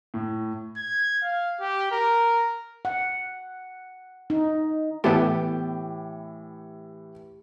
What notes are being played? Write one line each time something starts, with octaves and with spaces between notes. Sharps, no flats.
A2
G#6
F5
G4
A#4
F#5
D#4
A2 E3 B3 E4 G4 A4